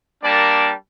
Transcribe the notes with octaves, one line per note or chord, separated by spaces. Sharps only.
G3 A#3 D4 A#4 D5 A5